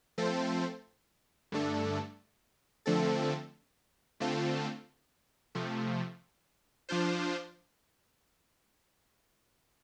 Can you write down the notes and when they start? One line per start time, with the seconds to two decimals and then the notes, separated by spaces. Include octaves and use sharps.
0.18 F3 A3 C4 A4 C5
1.52 G2 D3 A3 D4 A4
2.86 D3 F3 A3 C4 A4
4.20 D3 A3 C4 F4 A4
5.55 C3 F3 A3
6.89 F3 D4 F4 C5